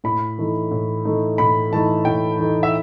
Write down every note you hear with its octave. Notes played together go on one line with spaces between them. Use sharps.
A2 B5
E3 A3 D#4
A2
E3 A3 D#4
A2 B5
E3 A3 D#4 A5
A2 G5
E3 A3 D#4
E5